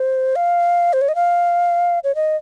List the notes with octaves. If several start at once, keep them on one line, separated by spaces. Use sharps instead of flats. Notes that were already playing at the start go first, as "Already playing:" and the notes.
Already playing: C5
F5
C5
C#5
D#5
F5
C#5
D#5